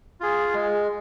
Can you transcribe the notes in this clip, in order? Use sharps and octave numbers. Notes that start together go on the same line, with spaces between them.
F4 G#4
G#3